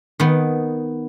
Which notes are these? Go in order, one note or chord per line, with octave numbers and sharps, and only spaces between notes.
D#3 B3